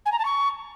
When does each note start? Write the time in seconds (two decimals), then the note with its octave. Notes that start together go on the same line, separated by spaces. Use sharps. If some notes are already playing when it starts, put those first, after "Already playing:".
0.06 G#5
0.12 A#5
0.19 A5
0.25 C#6